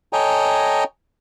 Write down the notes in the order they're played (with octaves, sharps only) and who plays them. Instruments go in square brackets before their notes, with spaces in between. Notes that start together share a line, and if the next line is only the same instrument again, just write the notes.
[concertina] A4 C#5 D#5 G5 G#5 A#5